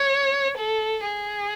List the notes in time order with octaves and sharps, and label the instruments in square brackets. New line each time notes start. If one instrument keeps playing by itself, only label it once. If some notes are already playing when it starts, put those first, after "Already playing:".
Already playing: [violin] C#5
A4
G#4